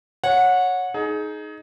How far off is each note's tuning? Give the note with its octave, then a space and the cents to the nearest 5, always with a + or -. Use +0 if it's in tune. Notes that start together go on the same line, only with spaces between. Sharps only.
C#5 +0 F#5 -20
D#4 +0 G#4 +25